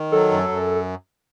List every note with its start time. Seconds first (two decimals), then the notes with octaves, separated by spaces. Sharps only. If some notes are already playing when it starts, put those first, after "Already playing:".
Already playing: D#3
0.12 F#3 A4
0.31 F#2
0.49 F#2